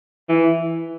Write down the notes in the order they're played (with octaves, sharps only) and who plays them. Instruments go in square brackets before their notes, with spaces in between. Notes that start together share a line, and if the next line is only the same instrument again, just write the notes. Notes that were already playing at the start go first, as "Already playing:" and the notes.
[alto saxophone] E3